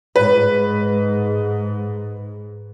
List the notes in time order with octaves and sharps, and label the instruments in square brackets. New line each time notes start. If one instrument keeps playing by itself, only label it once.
[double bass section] G#2 [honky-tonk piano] B4